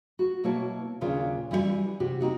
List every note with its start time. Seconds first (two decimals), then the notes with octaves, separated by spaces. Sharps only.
0.19 F#4
0.44 B2 A#3 E4 C#5 A5
1.01 D#2 A#2 C#3 D4 F4
1.51 E3 G3 E4 F#4 G#5
2.00 C3 F#4 G4
2.20 C4 D4 D#4 F#4